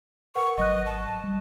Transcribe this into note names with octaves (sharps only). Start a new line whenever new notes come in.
A#4 B4 F#5 C#6
G#1 F#3 D#5 C#6 F#6
A5
G3